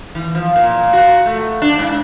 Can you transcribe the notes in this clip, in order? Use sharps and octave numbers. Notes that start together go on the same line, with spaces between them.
E3
F3
A#2
F#4
A3
D4
G#2